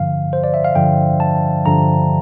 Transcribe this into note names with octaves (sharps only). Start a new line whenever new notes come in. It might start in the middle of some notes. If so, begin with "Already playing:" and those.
Already playing: G2 D3 F3 F5
C5
D5
E5
F5
G2 D3 F3 G5
A5
G2 D3 F3 A#5